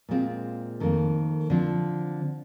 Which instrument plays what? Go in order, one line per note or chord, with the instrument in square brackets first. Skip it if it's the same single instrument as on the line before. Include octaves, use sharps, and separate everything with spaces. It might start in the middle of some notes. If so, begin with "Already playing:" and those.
[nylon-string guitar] A#2 G#3 C4 F4
F2 D#3 G3 A#3
D3 F3 C4